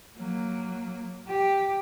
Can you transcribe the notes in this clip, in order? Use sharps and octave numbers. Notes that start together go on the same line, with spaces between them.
F#3 A#3
G4